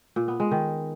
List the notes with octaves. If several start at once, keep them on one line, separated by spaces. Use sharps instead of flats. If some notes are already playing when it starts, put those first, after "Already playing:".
A#2
B3
G#3
D#3